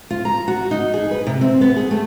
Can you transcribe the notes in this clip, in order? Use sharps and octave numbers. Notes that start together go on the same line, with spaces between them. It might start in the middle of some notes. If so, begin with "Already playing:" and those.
F4
A#5
F#4
D#4
G#4
B4
C3
C4
B3
G#4
A3